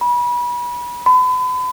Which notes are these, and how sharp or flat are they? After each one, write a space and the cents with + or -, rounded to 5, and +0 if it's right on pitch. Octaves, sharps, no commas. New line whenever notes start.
B5 -30
B5 +35